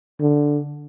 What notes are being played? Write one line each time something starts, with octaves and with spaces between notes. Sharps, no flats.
D3